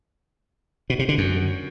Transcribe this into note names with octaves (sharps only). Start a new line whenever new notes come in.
B2
C3
D3
F#2